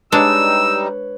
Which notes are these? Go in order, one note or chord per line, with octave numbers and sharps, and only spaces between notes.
G3 G#3 D4 D#4 B4 C#5 E6